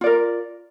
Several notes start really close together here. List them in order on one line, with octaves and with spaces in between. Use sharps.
F4 D5 A#4